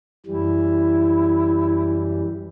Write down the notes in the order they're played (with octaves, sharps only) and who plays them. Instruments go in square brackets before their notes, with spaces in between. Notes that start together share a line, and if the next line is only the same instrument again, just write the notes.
[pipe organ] F#2 E3 G3 [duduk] E4